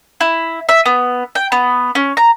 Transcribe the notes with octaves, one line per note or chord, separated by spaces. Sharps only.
E4
E5
B3
G5
B3
C#4
A#5